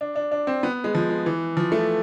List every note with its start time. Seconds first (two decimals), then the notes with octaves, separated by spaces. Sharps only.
0.01 D4
0.16 D4
0.32 D4
0.47 C4
0.63 B3
0.84 G#3
0.95 F3
1.10 G#3
1.26 E3
1.57 F3
1.72 A3